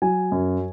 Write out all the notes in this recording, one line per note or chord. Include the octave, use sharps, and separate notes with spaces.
F#3 G#5
F#2